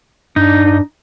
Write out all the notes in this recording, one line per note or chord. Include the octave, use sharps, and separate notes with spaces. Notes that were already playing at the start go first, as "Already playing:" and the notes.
G2 D4 D#4